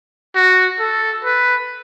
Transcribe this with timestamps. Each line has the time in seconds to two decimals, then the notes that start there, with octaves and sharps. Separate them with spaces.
0.35 F#4
0.80 A4
1.25 B4